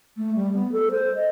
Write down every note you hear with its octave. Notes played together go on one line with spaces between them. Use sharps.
A3
G3
B3
A4
C5
D#5